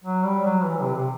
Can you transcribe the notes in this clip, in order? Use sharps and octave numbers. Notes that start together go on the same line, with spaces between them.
F#3
G3
F#3
E3
C3
C3